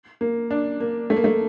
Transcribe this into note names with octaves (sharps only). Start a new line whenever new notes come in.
A#3
D4
A#3
A3
A#3
A3